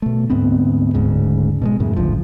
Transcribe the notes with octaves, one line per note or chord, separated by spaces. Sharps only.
B2 A3
D2 G#2 B3 C4
D1 D2 G#2 C#3
B2 G3 G#3
F#2 A2 C#3
G#1 D2 F3